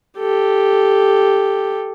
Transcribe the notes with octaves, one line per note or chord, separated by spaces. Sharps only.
G4 A4